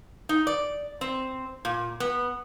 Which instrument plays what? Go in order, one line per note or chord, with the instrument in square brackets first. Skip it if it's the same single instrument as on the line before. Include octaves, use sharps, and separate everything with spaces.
[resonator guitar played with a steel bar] D#4
D5
C4
A#2
B3